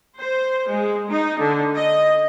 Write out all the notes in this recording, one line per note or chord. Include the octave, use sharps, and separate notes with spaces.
C5
G#3
D#4
D3
D#5